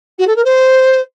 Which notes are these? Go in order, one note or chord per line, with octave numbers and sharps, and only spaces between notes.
F#4
A4
A#4
C5